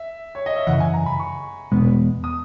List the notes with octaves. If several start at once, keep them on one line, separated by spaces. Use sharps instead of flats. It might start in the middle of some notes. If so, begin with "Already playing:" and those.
Already playing: E5
C#5
D#5
E5
F#2 C#3 E3 F#5
G#5
A#5
B5
C#6
E2 B2 G#3 B3
D#6